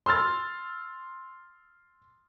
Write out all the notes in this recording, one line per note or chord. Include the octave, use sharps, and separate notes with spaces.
C6 E6 F6 A6